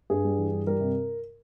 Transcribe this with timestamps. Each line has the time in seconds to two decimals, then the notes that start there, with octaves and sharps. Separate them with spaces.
0.10 G2 G#4
0.24 G3
0.38 E3
0.52 G2
0.67 G3 A#4
0.80 C3